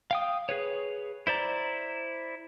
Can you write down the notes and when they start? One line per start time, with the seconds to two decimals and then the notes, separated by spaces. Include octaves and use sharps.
0.11 F5 G5 D#6
0.49 G#4 B4 C#5
1.27 E4 C5 D5 A#5